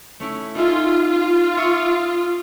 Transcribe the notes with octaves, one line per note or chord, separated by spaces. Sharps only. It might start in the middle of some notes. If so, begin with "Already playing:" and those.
A3 C#4 E4
D#4 F4 G#4 E5
F4
E5 C#6 D#6